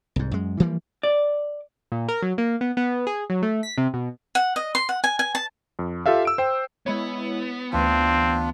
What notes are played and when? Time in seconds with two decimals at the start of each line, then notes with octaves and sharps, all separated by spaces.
0.16 C2 G#2
0.31 F#2 G#3
0.60 E3 F3 G3 A#3
1.03 D5
1.92 A#2
2.08 A#4
2.22 F#3
2.38 A#3
2.61 B3
2.77 B3
3.07 G#4
3.30 F#3
3.43 A3
3.63 B6
3.78 C3
3.94 B2
4.35 F#5
4.56 D#5
4.75 C6
4.89 F#5
5.04 G#5
5.19 G#5
5.35 A5
5.79 F2
6.06 F4 G4 A4 E5 F5
6.25 E6 D7
6.38 C5 G5
6.86 G#3 B3 E4 C#5
7.73 D2 E3 C4 D4 F4